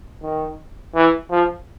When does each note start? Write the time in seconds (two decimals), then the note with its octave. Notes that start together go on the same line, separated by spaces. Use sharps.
0.22 D#3
0.95 E3
1.31 F3